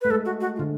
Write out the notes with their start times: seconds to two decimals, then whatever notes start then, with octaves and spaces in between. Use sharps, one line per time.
0.02 A3 B4
0.10 G#3 A4
0.25 F#4
0.41 F#4
0.56 F4
0.59 D3